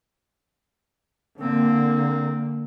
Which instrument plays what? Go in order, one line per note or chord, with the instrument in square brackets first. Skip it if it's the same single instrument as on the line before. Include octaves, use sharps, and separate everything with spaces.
[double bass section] D3 A#3 [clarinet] C4